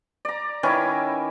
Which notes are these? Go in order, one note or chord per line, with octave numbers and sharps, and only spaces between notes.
D5 A#5
D#3 C#4 E4 B4 G#5 D6